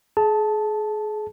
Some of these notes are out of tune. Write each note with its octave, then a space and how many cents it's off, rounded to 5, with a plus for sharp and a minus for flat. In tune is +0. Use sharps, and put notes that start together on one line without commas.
G#4 +35 A5 -5